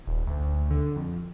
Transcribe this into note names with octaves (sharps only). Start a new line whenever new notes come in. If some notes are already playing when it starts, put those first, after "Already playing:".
D#1
D2
D3
F2